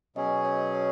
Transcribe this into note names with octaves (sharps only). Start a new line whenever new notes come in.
B2 F#3 C#4 G#4 D#5
C#5
C#5